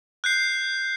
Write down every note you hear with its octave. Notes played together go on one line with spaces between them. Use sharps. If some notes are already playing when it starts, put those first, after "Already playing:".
F#6 G6 C7